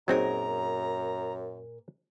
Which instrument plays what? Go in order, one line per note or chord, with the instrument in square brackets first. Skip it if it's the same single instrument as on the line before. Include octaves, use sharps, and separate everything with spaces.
[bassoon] F#2 [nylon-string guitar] A#2 G#4 A#4 [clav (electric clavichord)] F#3 C4 D#4 [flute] A#5